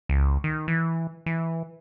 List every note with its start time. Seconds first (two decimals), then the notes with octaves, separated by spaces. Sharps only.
0.09 C#2
0.44 D#3
0.68 E3
1.26 E3